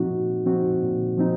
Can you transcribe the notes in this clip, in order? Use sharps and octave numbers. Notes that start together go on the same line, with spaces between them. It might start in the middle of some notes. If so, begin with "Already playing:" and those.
Already playing: A#2 F3 C4 D#4 F#4
A#2
F3 C4 D#4 F#4
A#2
F3 C4 D#4